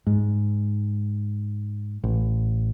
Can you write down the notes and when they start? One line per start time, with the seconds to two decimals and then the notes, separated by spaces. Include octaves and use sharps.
0.07 G#2
2.04 A1